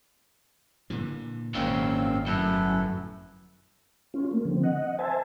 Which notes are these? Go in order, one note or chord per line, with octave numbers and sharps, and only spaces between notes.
A#2 D3 E3
G#1 F#2 A#2 C#3 C4 F5 E6
G1 F#2 A2 E4 A4 B4
C#4 F4
A3 A#3
D3 F3 C4
D#5 F#5
C5 E5 G#5 A5